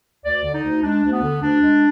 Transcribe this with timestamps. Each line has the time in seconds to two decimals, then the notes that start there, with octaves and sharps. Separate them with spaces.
0.24 D2 D5
0.43 D3
0.53 D#4
0.63 D2
0.82 G#3 D4
1.02 D2
1.12 B3
1.22 D3
1.41 D2 D4
1.61 G#3